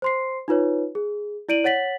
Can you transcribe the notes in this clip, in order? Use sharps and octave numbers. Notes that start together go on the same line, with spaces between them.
C5 C6 C7
D#4 F4 B4 C#5
G#4
E4 D5 D7 D#7 F#7
C#5 F#5 A6 B6 F#7